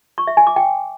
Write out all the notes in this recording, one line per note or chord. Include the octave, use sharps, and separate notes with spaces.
C#6
E5
G#5
D6
G5